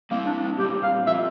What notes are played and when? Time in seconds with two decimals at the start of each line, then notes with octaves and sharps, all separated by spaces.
0.11 G3 A#3 C4 E4
0.26 D4
0.59 A#2 G3 C4 G4
0.83 F5
1.07 F3 C4 F4 E5